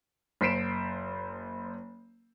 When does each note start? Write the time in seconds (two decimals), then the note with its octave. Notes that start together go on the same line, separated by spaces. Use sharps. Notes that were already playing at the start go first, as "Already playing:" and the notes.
0.41 F#1 C5 B6 C7 D7 E7